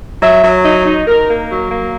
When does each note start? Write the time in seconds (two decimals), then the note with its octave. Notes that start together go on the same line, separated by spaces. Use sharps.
0.22 F#3 E5
0.44 F#3
0.65 D#4
0.86 D#4
1.07 D#4 A#4
1.28 A#3
1.50 F#3
1.71 A#3